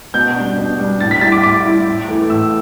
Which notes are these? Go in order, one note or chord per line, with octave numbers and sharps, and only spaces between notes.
B2 G6
G3 D4
B2
G3 D4
A2 A6
B6
G3 E4 A6
D6
A2 D6
G3 E4
A2
E3 A3 E4
A2 E6